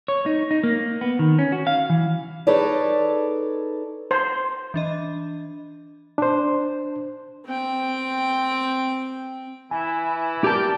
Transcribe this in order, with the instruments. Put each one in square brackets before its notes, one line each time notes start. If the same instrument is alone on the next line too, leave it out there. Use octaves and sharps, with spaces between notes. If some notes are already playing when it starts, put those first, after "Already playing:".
[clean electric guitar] C#5
D#4
D#4
A#3
B3
D#3
C#4
F#4
F5
E3
[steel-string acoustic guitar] D#4 G#4 A4 B4 C#5 D5
[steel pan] C5
[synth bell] E3 D4 D#5
[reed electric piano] D4 C5
[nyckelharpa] C4 G5
[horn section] E3 E4 [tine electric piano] G#5
[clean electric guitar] G4 A5 [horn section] A#4 D5 G5